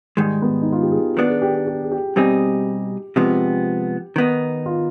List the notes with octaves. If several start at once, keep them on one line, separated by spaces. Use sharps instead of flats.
G#2 D#3 G3 G#3
B3
D#4
F4
G4
G#4
D#3 B3 D4
G#4
G4
G4
G4
G#4
G4
B2 G3 C4 D#4 G4 G#4
C3 F3 G#3 B3 G4
D#3 B3 D#4
F4